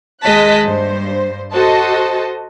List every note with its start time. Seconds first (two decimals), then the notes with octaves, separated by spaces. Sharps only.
0.24 D#2 G#3 D#5 A5 F#6 B6
0.63 G2 C5
1.53 F#4 A4 C5 D#5 A5